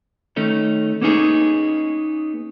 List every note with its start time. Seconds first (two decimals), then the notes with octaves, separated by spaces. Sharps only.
0.36 D#3 A3 C#4 D#4
1.01 A#3 B3 C#4 D#4 G#4